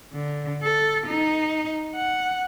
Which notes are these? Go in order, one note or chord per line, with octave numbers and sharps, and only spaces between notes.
D3
A4
D#4
F#5